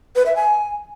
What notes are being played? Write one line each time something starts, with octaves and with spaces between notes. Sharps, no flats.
B4
E5
G#5